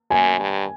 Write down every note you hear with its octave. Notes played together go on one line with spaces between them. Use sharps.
F#2 G#5
G2